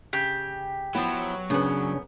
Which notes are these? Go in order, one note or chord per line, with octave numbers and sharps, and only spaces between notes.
C#3 G4
F3 F#3 B3 E4
F#2 C#3 B3 D4